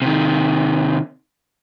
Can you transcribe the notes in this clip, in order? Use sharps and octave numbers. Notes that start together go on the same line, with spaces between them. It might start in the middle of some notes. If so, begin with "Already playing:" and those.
C3 D#3